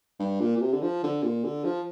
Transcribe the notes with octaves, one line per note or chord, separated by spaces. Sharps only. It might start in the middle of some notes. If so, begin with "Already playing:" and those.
G2
A#2
A#2
C3
D3
F3
D3
A#2
D3
F3